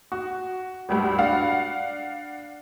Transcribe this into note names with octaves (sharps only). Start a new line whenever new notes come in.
F#4
G#1 D2 G2
D4 F5 F#5